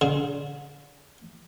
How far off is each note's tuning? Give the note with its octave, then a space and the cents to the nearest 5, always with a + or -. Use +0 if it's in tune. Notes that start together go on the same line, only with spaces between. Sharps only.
D3 -35 G#4 +0